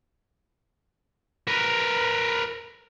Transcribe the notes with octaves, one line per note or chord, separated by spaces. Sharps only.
A#4 B4